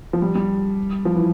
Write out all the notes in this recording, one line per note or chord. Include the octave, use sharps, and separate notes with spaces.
F3
G3
G3
F3
E3